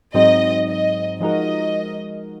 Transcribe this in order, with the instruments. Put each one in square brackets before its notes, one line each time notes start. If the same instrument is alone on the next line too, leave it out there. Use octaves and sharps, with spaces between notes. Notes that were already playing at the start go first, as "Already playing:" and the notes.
[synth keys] G#2 F#3 C4 D#4 [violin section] D#5
[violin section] D#5
[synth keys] F3 G#3 D#4 F#4 A#4 [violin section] D#5